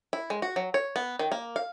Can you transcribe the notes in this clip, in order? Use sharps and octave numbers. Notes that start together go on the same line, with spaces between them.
E4
G#3
F#4
F#3
C#5
B3
D#3
A#3
F5